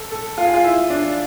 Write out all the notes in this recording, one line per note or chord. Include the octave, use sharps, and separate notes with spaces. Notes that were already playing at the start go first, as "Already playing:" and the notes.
Already playing: A4
A4
F4
G#4
F4
E4
D4